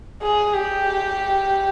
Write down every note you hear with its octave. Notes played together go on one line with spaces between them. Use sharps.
G#4
G4